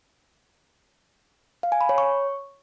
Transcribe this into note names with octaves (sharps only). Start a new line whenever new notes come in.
F5
G#5
B5
C#5
C#6